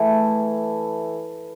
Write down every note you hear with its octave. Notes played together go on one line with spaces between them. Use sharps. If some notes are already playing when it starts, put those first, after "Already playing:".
Already playing: E3 A3 E4